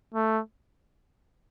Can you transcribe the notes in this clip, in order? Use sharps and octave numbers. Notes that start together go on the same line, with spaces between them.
A3